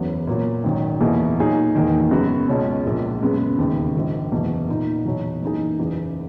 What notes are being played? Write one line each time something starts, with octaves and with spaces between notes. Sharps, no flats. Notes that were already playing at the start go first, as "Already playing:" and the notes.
Already playing: F#1 E2 C#3 F#3 B3
A#2 F#3 A#3
G#1 F#2 D#3 F#3
E2 B2 A#3 E4 G#4
A#2 F#3 A#3 D#4 G#4
E1 E2 D#3 A#3
F#2 C#3 G#3 B3 F#4
C#2 B2 G#3 C#4
A#1 A#2 G#3
F#2 C#3 G#3 B3
E1 D#2 C#3
A#1 G#2 D#3
F#1 E2 B2
A#2 A#3 D#4
E2 B2 F#3
F#2 E3 A#3 D#4 G#4
F#1 E2 C#3